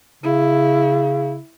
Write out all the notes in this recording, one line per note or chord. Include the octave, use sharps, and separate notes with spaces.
C#3 E4